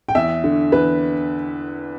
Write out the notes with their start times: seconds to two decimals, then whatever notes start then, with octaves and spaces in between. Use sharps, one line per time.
0.09 G5
0.15 E2 E5
0.44 D3
0.72 E2 B4